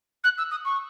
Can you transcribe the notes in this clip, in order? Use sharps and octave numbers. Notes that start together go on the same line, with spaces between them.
F#6
E6
D#6
C#6